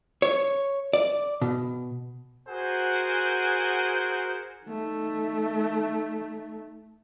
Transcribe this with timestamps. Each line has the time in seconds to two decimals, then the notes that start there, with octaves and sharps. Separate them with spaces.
0.22 C#5
0.93 D5
1.41 B2
2.49 F#4 G#4 A#4 C5 F#5 G#5
4.65 A3 D#4